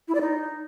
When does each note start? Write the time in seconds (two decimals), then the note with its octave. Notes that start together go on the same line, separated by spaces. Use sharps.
0.08 E4
0.14 D5
0.21 D#4